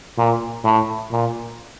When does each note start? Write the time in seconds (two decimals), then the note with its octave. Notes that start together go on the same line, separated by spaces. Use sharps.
0.18 A#2
0.64 A2
1.11 A#2